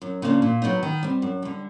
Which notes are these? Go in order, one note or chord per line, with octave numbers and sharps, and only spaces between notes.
F#2
C#3 F3 A#3 D4
A#2
F#3 B3 D#4
D#3
G3 C4
F#2
D3 G3